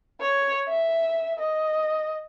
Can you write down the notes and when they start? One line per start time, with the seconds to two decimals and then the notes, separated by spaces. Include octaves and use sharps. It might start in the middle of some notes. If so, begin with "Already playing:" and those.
0.20 C#5
0.68 E5
1.39 D#5